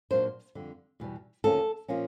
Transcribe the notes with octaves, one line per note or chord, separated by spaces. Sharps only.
A#2 F#3 A#3 D4 C5
F2 D3 G3
E2 B2 G3
D2 C#3 F3 A#3 C#4 A4
A#2 F3 A#3 C#4